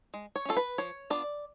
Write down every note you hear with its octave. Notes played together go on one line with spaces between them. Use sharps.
G#3
C#5
C#4 F4 A4
B4
F3 C#5
B3 D4 F4 D5